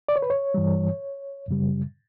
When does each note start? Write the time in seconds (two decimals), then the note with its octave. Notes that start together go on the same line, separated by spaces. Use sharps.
0.09 D5
0.16 C#5
0.22 B4
0.30 C#5
0.54 G2 E3 G3
1.48 F#2 C#3 G3